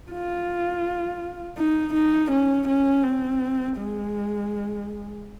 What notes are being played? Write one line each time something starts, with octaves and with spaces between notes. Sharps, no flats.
F4
D#4
D#4
C#4
C#4
C4
G#3